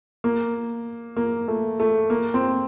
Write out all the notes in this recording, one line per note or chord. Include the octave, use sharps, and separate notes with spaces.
A#3
A#3
A3
A3
A#3
C4